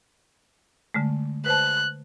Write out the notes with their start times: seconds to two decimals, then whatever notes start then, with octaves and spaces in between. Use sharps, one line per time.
0.94 D3 G#3 A3
1.46 B4 C5 A5 F#6